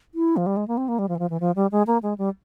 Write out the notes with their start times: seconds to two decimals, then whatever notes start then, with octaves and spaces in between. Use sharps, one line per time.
0.15 E4
0.37 F3
0.46 G3
0.57 G#3
0.68 A#3
0.77 C4
0.88 A#3
0.99 G3
1.09 F3
1.15 E3
1.19 F3
1.30 E3
1.40 F3
1.56 G3
1.72 G#3
1.87 A#3
2.03 G#3
2.18 G3